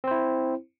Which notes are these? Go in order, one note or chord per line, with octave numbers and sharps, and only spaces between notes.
C4 E4 C5